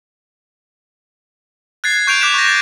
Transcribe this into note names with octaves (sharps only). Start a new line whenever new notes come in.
F#6 G#6 A6 C7
C#6 G6 D7 F7
D6 F#6 B6 E7
C#6 A#6
A6 D7